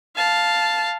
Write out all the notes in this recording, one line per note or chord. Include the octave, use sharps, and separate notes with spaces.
F5 A5